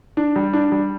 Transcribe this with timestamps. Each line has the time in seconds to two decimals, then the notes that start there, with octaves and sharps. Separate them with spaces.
0.17 D4
0.36 G3
0.53 D4
0.72 G3